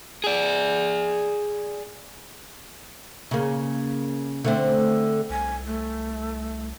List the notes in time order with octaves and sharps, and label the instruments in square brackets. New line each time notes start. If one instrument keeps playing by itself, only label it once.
[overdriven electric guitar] G#4 D5
[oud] C#3 A#3
D3 A3 C4
[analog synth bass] C2 [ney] G#5
[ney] A3